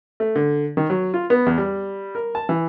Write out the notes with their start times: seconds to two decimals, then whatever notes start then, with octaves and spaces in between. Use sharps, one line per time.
0.20 A3
0.36 D3
0.77 D#3
0.90 F#3
1.14 F4
1.30 B3
1.46 E2
1.58 G3
2.15 A#4
2.35 A5
2.49 E3